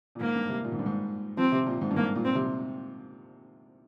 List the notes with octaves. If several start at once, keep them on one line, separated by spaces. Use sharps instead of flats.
A#2
G#2 A#3
G2
C3
A#2
G#2
G2
G#2
F3 C4
C3
A#2
G#2
G2
G#2 A#3
A#2
C4
C3